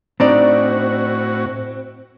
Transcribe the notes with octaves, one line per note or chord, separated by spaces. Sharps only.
A2 C4 D4 D#4 F#4 D5